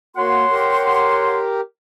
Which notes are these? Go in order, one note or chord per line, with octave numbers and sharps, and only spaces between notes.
A#3 F#4 C#5 F#5 C6
G4 A#4